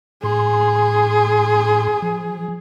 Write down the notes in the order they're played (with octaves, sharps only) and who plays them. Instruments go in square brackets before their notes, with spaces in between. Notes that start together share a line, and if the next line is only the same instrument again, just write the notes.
[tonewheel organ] A2 C6 [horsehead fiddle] G#4
[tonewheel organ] F3